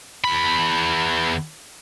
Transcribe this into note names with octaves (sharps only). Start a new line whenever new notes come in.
E2 B5